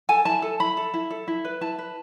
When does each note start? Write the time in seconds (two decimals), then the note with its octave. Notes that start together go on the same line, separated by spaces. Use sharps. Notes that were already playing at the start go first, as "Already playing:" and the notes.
0.09 A4 G#5
0.25 E4 A5
0.42 A4
0.60 E4 B5
0.77 A4
0.94 E4
1.10 A4
1.28 E4
1.45 B4
1.61 E4 A5
1.79 B4